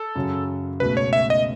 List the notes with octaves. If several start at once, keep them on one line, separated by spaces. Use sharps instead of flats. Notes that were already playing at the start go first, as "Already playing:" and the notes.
Already playing: A4
F#2 C#3 F#3
C#2 B2 A3 B4
C#5
E5
D#5